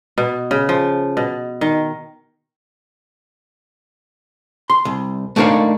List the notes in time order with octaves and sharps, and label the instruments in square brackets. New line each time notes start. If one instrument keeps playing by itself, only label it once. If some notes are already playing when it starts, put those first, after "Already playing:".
[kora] B2
C#3
F3
B2
D#3
[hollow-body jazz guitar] C6
C2
A3 A#3 D4 D#4 C#5 F5